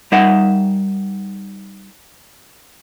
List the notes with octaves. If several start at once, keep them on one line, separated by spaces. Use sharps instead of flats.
G3 D#4 A#4 E5 F#5